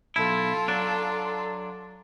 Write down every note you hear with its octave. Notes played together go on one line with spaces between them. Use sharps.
B1 E4 F4 A4
F#3 D4